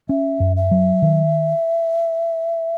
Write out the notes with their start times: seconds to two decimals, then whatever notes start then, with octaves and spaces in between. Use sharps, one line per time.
0.09 C#4 E5
0.40 F#2
0.56 E5
0.71 F#3
1.02 D#3